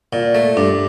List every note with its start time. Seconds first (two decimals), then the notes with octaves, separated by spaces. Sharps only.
0.13 A#2
0.35 A3
0.57 G2 D4